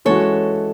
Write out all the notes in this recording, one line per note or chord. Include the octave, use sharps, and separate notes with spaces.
E3 G#3 C#4 F#4 A4 C#5